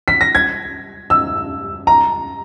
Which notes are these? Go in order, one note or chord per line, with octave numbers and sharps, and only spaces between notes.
B6
A#6
G#6
E6
A#5